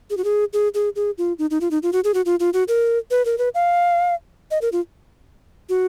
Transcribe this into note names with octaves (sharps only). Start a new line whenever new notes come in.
G#4
F#4
G#4
G#4
G#4
G#4
F4
D#4
D#4
F4
D#4
F4
F#4
G#4
F#4
F4
F4
F#4
A#4
B4
A#4
B4
F5
D#5
A#4
F4
F#4